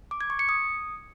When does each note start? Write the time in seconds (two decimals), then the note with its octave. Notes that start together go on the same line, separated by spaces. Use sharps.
0.11 D6
0.21 G#6
0.30 C#6
0.39 C#7
0.49 D#6